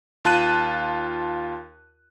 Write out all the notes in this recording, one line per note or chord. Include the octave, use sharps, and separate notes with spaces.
D#2 F4 A5 F#6 D#7